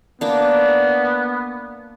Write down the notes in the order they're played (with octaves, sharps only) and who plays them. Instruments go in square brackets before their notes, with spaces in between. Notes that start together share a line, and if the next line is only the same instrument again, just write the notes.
[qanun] A#3 D4 [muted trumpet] B3